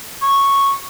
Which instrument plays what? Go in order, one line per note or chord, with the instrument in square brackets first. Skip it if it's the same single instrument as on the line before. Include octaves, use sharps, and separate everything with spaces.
[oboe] C#6